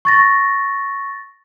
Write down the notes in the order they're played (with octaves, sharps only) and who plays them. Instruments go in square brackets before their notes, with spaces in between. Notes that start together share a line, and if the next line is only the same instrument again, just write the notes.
[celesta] C#6 A6 A#6